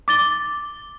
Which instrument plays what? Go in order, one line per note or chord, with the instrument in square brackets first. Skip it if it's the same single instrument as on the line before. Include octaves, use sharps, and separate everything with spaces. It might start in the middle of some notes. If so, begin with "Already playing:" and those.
[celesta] D6 A6 G7